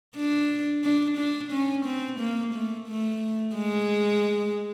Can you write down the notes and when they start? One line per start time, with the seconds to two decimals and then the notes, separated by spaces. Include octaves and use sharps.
0.16 D4
0.84 D4
1.18 D4
1.52 C#4
1.86 C4
2.20 A#3
2.54 A3
2.88 A3
3.55 G#3